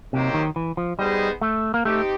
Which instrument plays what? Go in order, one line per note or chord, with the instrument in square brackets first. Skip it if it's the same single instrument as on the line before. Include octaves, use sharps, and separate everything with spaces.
[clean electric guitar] C3 [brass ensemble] F#3 A#3 D#4 G4 C5
[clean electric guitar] D#3
E3
F3
[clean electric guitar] G3 [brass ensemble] B3 D#4 G#4 C5 D#5
[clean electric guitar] A3
A#3
[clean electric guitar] A3 [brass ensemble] C4 D#4 G4